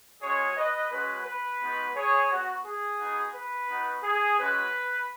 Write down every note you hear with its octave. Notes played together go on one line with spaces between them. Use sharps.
G#3 C#4 F#4 G#4 C#5
B4 D#5
G#3 C#4 F#4 B4
B4
G#3 B3 D#4 F#4
G#4 C#5
B3 F#4
G#4
B3 D#4 F#4
B4
B3 D#4 F#4
G#4
G#3 C#4 F#4 B4